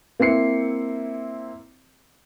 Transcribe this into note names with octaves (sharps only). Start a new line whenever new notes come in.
A#3 C4 E4 C7 C#7